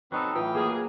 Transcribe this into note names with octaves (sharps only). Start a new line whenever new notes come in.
F#3 C4 D#4 A4 B4 C#6
A2 E3 F4 B4 G5 D#6
F#3 A#3 G#4